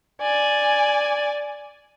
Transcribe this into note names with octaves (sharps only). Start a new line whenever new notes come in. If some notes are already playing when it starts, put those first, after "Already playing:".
D5 G#5